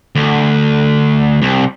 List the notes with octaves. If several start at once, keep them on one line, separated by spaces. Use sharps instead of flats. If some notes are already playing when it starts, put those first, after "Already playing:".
D2
C2